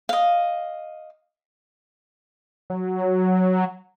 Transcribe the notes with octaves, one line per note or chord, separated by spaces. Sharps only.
D#5 F5
F#3